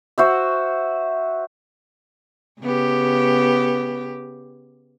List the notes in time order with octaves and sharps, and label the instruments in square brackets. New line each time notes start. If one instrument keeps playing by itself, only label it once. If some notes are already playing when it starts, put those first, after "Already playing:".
[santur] F#4 C5 E5
[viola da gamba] C#3 B3 G4